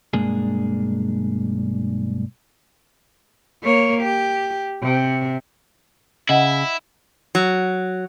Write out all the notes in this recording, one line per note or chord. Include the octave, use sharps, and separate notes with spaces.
B1 G2 G#3 A#3 D4 G#4
A#3 C#5
G4
C3
C#3 E4 D#5 F#5
F#3